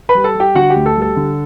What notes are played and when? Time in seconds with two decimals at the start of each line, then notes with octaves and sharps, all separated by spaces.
0.09 B4 B5
0.15 G3
0.24 A4 A5
0.35 G3
0.40 G4 G5
0.55 D3 F#4 F#5
0.70 G4
0.76 D2
0.86 A4
0.96 G3
1.02 A4
1.16 D3